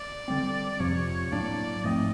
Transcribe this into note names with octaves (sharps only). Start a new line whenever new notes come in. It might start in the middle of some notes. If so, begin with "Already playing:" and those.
Already playing: D5
D3 G3 C4
F2 C3 F3 C#5
A2 F#3 A#3 D4 D5
G#2 F3 A3 C4 D#5